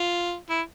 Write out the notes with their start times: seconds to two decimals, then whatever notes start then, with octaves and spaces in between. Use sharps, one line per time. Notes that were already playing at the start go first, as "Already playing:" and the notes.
Already playing: F4
0.49 E4